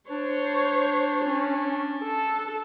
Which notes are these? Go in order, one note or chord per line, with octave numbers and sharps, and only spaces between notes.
D4 C5 C#5
C#4
A4